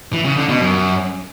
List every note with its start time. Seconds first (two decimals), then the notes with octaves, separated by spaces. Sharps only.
0.13 E3
0.25 C#3
0.37 D3
0.49 B2
0.61 F#2